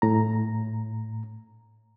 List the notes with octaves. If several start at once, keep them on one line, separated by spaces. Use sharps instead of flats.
A2 A#5